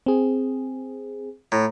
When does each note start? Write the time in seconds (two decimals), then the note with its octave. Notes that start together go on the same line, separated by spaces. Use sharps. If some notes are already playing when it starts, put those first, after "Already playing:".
0.06 C4 G#4
1.52 A2 A#5